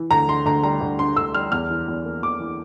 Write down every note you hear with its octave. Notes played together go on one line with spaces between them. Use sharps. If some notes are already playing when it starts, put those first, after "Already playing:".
Already playing: E3
D2 A#5
D3 C6
D2 A#5
G3 A#5
D2
D3 C6
D2 E6
G3 F6
E2 F6
E3
E2
A#3
E2 D6
E3